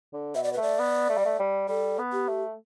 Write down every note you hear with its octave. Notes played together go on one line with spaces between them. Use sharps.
D3
B2 E5
D5
A3 B4
D5
B3
A3
G3
A3
G3
G3 A4
B3
G4
A3